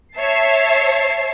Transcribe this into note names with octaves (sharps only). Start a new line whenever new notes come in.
C#5 E5 A5 C7